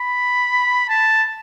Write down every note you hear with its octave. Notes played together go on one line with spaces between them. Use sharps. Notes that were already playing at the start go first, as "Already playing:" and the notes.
Already playing: B5
A5